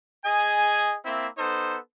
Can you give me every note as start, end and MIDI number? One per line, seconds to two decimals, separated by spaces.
0.25 0.96 68
0.25 0.96 75
0.25 0.96 80
1.05 1.27 58
1.05 1.27 60
1.05 1.27 64
1.05 1.27 76
1.37 1.77 59
1.37 1.77 63
1.37 1.77 69
1.37 1.77 72